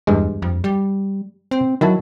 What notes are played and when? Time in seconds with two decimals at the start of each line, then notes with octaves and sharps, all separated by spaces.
0.07 E2 G2 G#3
0.42 F2
0.64 G3
1.51 C4
1.81 D#3 F#3 E4 A5